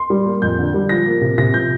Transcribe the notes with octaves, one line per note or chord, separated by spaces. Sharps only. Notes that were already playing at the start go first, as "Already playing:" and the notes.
Already playing: C6
G3
A#3
F2 G6
D3
G3
F3 A#6
A#3
C3
C3 A#6
F3 G6